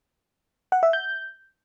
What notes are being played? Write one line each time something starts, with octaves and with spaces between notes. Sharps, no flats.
F#5
E5
G6